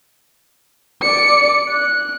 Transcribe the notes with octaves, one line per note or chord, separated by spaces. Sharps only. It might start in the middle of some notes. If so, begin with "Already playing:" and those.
D5 C#7
F#6